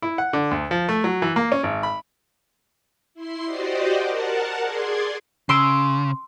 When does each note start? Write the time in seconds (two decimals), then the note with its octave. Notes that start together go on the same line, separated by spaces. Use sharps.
0.02 E4
0.18 F#5
0.33 D3
0.51 D2
0.71 F3
0.89 A3
1.04 F#3
1.22 E3
1.36 A#3
1.52 C#4
1.63 G#1
1.83 B5
3.14 E4 C6 C7
3.45 F#4 G4 C5 D5 D#5
3.98 A#4 F#5 A5
4.61 G#4 D5 G#5 C6
5.49 C#3 C6 E6 D7